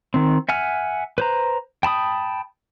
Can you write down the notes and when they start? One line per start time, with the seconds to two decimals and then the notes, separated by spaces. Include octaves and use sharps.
0.14 D#3 C4
0.49 E5 F#5 G#5 F6
1.18 B4 C5 A#5
1.83 G5 A5 B5 D#6